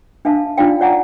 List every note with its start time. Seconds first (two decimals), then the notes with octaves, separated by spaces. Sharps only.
0.25 D4 E5 F5 A5
0.58 D4 D#4 F4 D5 F5 G5
0.81 C#5 D5 F#5 G#5 A#5